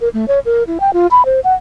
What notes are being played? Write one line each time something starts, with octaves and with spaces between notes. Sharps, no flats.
A#4
A3
C#5
A#4
E4
G5
F4
B5
C5
F#5